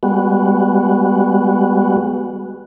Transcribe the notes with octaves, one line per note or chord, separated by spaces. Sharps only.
G3 G#3 B3 F#4